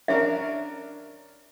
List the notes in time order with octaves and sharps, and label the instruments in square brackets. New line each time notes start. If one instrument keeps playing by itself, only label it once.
[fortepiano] C#4 D4 A#4 [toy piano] E5